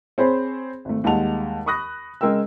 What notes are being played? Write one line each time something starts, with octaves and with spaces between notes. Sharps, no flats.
C4 G#4 C5 C#5 B5
G#1 A3
D#2 G3 G#3 F#5 A5 F7
B5 C#6 D#6 F#6 A#6
C#3 G#3 A#4 G5 E6